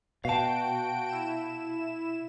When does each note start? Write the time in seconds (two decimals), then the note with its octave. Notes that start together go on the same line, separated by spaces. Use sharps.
0.25 B2 F#4 F5 G5 A5 D7
1.09 E4 E7